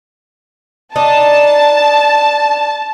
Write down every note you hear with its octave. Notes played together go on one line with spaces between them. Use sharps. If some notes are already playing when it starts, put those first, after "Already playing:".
D4 D#4 A5